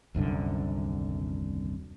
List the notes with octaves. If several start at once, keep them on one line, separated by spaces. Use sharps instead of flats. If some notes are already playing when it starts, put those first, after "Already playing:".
D#1 C2 F#2 D3